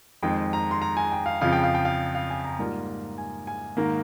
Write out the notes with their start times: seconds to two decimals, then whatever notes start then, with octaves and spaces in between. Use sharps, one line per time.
0.23 F2 D#3 G#3 C4 G5
0.53 A#5
0.71 C6
0.82 A#5
0.97 G#5
1.12 G5
1.26 F5
1.41 F2 C#3 F3 F5
1.53 G5
1.63 F5
1.75 G5
1.85 F5
2.15 F5
2.30 G#5
2.45 A#5
2.59 G#2 G3 A#3 F4
3.18 G#5
3.47 G#5
3.77 G#2 D#3 A#3 A#5